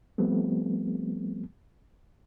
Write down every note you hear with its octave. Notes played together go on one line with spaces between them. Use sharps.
F3 G3 A3 B3 C4